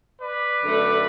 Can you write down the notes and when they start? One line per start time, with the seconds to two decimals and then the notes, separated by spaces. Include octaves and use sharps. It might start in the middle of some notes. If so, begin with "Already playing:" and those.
0.20 B4 D5
0.62 F#2 D3 A3